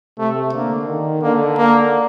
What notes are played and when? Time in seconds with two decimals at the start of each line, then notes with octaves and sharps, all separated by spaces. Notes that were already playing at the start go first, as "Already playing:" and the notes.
0.18 C3 A3
0.53 D3 A#3
0.88 D#3
1.22 D3 A#3
1.58 A#3